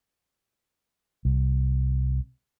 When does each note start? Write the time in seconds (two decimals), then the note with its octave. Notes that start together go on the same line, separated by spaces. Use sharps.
1.25 C2